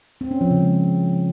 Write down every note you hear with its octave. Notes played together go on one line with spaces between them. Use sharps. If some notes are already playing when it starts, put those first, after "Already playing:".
C4
C#4
F3
C#3
G#3